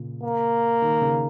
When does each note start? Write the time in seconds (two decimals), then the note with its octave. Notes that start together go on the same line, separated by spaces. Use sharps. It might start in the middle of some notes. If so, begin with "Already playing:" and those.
Already playing: A#2 C#3
0.23 A#3
0.82 D#3
1.02 C#3